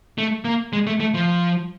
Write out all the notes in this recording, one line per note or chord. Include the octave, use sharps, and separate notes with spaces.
A3
A#3
G#3
A3
A3
F3